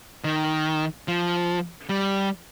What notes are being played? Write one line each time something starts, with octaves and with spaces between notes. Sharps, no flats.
D#3
F3
G3